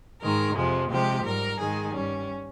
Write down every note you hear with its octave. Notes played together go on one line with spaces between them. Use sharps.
G#2 D#3 G#3 A#4
F2 C3 F3 G#3
C3 F3 G#3 G4
G#2 G3 A#4
G#2 D#3 G#3 G#4
G2 G3 C#4